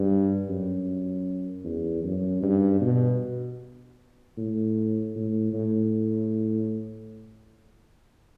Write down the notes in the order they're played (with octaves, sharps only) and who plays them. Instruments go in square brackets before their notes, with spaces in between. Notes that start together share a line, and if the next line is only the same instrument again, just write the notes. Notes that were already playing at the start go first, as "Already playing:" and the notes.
Already playing: [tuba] G2
F#2
E2
F#2
G2
B2
A2
A2
A2